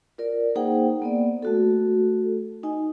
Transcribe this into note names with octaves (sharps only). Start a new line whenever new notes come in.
F4 A#4 D5
A#3 D#4 G#4 C5 F#5 G5
A#3 B3 D5
A3 F#4 A4
D#4 D#5 G#5